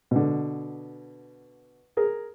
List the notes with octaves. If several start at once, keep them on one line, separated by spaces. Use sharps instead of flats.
B2 D3
G#4 A#4